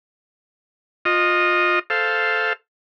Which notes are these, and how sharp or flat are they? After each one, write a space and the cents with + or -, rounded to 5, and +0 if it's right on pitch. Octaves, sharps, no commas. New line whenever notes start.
F4 +25 D#5 -10
A4 +0 C5 +0 F5 +0